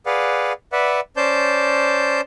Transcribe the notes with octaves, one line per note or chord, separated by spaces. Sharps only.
G#4 B4 D5 F5 F#5
B4 D5 E5 F#5
C#4 C5 D5 A5 G6